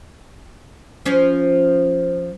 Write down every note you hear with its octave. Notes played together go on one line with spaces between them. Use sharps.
F3 C#4